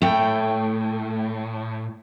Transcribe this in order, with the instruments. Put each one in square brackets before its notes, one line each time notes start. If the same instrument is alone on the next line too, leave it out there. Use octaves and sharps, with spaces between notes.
[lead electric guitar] A2 [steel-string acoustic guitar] A3 G5